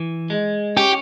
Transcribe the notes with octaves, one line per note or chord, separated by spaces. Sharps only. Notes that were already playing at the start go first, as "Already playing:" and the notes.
Already playing: E3
G#3
C#4 G4